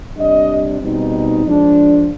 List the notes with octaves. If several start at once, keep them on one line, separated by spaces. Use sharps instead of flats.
C3 G3 D4 D#5
B2 G3 C4 D#4
F3 G#3 D4